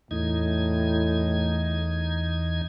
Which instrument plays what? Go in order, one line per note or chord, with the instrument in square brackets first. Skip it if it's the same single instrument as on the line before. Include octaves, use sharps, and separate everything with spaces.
[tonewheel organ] E2 D#4 G#6 [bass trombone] A2